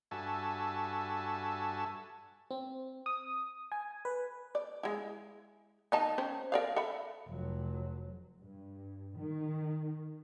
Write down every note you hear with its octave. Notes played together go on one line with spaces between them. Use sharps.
G2 F#4 A4 E5 G#5 A5
C4
D#6
G#5
B4
D5
G#3 E4
D#3 D#4 A5
C4 C#4 C5
A#4 D5 F5
A4 E5 B5
F1 F#3
G2
D#3